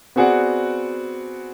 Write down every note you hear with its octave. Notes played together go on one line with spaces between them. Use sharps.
B3 C4 F#4 G#4 D5 F#5